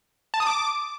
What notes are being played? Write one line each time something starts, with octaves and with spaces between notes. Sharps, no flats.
A5
D#6
D6